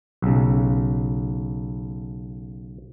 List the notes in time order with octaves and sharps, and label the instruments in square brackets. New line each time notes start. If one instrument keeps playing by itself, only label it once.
[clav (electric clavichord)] B1 C#3